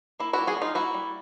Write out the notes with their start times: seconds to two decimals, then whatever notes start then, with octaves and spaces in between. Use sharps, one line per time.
0.20 A#3 E4
0.33 G3 E4 F#4
0.47 F#4 G#4
0.57 D4
0.61 D#4 F4
0.75 A#3 E4 F#4
0.94 G3